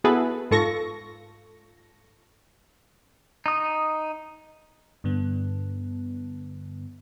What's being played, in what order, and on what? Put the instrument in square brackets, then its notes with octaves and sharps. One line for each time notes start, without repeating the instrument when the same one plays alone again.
[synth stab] B3 E4 F#4 G#4 A4 B4
G#2 F4 A4 C#6 A#6
[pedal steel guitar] D#4 D#6
[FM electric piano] G2 D3 B3